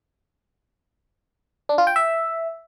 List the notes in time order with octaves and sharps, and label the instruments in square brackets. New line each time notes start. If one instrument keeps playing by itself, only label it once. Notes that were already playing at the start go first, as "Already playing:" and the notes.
[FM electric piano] D4
F4
G5
E5